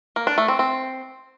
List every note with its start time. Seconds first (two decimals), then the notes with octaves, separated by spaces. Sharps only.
0.16 A#3
0.27 D4
0.38 A3
0.48 C4
0.59 C4